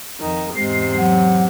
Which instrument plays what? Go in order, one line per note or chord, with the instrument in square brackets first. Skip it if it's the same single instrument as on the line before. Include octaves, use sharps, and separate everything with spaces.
[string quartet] F2 D#3
[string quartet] E2 G#2 C3 [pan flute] G#3 [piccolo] C7
[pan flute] F#3 [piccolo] F#5